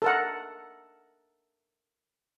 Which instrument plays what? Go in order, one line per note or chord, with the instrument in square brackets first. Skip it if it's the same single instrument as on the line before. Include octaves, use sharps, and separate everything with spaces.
[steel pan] A4 A#4 F#5